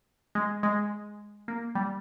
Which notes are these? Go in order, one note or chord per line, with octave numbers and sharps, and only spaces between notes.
G#3
G#3
A#3
G3